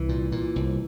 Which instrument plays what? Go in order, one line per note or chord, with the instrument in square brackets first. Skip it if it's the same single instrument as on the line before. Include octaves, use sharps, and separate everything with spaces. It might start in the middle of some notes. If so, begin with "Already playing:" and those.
Already playing: [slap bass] C2 E3
A#2
A#2
C2